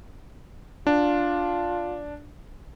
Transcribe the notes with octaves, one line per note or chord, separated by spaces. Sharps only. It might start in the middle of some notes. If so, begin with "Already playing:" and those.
D4 F4